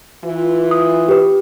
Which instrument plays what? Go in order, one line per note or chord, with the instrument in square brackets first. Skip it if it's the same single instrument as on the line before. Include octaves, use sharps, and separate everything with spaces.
[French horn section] E3 F4
[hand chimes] D#6
G4 B4